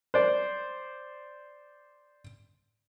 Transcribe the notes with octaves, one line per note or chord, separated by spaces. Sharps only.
C5 D5